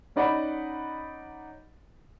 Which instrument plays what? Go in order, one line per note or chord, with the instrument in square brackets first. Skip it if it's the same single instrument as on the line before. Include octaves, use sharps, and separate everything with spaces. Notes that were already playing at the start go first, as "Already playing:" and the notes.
[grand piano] C#4 D#4 D5 D#5 F#5 B5